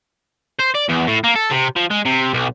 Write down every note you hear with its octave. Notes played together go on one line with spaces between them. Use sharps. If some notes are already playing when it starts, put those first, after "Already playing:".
C5
D5
E2
A2
A#3
A4
C3
F3
G#3
C3
B1